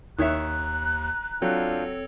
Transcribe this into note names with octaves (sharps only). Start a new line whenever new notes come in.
D#2 D#3 C#5 E5 A#5 F#6
F#3 C4 D4 F4 A4 C#5 G5